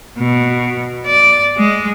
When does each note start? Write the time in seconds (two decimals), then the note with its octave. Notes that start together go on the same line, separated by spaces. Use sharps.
0.18 B2
1.06 D5
1.58 G#3